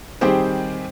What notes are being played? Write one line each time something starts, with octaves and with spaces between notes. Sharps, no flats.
D#3 G3 C4 G4 G#4 C5